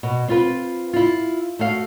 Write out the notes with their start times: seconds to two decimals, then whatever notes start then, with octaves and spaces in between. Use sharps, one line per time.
0.03 B2
0.28 C4 F4 B4
0.93 E4 F4
1.59 A3 F#4 F5